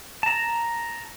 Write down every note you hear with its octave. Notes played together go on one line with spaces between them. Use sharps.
A5 A#5